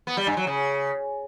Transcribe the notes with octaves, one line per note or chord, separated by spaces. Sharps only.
B3
G3
G2
F#3
C#3